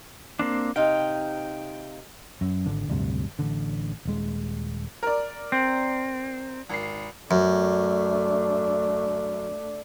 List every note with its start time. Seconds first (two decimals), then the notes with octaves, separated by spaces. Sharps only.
0.39 A#3 C4 D4
0.76 C3 D#4 F5 G5
2.41 F#2
2.65 G#1 D3
2.88 D1 D2 G2 C3
3.39 A1 D3
4.05 D#1 G#3
5.03 A#4 D5
5.52 C4
6.69 G#1 C7
7.31 F#2 A3 D4